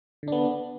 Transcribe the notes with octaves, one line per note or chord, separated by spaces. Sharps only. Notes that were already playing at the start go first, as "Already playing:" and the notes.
D3 B3 D4